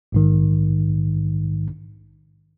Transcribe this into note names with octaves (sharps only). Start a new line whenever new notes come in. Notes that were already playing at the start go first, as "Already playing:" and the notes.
A#1 G#2 D#3